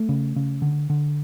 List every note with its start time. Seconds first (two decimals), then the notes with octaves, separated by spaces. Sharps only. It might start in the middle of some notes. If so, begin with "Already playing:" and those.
Already playing: A3
0.09 C#3
0.36 C#3
0.62 D3
0.90 D3